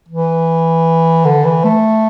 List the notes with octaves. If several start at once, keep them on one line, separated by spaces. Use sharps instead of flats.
E3
D3
E3
A3